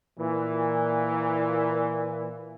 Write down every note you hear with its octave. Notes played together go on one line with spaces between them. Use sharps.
A#2 E3